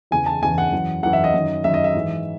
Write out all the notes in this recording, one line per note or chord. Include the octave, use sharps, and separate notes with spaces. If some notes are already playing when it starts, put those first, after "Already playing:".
E2 C#3 E3 G#5
A5
E2 C#3 E3 G#5
F#5
F#2 E3
F#2 E3 F#5
E5
D#5
F#2 D#3
F#2 D#3 E5
D#5
E5
G#2 E3